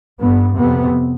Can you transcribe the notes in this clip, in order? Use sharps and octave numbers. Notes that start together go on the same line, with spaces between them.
G2 B3
F2 C3 B3